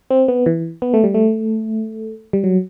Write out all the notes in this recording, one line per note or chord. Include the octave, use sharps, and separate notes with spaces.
C4
B3
E3
B3
A3
G3
A3
G3
F#3